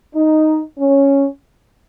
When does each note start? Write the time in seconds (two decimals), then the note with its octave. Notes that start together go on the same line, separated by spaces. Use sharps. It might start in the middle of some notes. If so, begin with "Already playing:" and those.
0.14 D#4
0.78 C#4